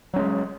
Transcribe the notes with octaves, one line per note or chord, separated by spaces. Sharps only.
F#3 G#3 C#4